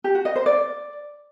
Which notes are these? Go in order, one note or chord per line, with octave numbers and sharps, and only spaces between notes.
G4
F#4
D#5
C5
D5